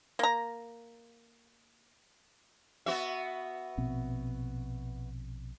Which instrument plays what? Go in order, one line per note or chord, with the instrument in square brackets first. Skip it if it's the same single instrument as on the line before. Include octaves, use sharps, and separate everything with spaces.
[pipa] A#3 A#5
[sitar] B3 F#4 E5
[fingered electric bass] A#1 B2 C4